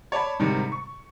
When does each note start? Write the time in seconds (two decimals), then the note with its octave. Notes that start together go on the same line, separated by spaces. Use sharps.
0.12 C#5 D5 A5 B5
0.39 G#2 C3 D#3 G3
0.72 C#6